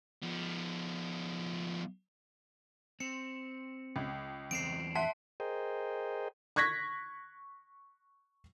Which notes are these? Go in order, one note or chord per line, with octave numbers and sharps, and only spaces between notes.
F3 B3
C4 C#7
C#2
E2 C4 C7 D7
E5 F#5 A5 C6 B6
G#4 A#4 C5 D#5 G5
C#6 F#6 G#6 A#6 B6